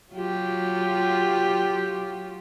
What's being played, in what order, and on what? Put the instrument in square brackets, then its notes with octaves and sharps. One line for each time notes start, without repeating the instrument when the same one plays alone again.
[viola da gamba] F#3 F4 G4